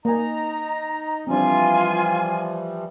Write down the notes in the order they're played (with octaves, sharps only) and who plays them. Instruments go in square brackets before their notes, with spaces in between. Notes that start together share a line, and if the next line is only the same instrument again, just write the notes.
[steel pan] A#3 G#5 [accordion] D#4 [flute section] A#5
[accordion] E3 F3 G3 [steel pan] C4 D4 [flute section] F4 G#5